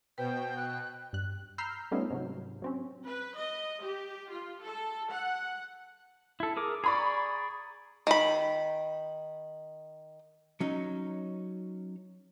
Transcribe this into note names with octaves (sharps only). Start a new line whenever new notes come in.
B2 B4 C5 G5
F#6
G2 F#6
A#5 B5 E6 F6 G6 C7
G3 A3 B3 C#4 D#4 F4
G#2 C3 F#3
F#3 C4 C#4
B4
D#5
G4
F4
A4
F#5
E4 A4
G#4 A#4 D6
G#4 D5 A#5 B5 C#6
D#3 B5
F#3 C#4 D#4